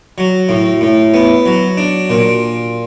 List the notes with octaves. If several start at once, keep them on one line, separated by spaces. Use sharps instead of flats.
F#3
A2
A2
B3
F#3
D4
A#2